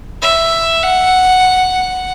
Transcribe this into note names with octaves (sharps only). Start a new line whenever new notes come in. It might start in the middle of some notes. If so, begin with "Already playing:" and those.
E5
F#5